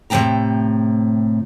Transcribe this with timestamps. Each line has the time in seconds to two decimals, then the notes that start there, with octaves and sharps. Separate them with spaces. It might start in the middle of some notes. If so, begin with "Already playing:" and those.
0.10 A2 C3 C4 D4 G5 A#5